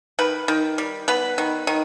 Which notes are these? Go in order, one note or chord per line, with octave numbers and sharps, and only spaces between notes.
D#3 B4
D#3
G3
B3 B4
D#3
D#3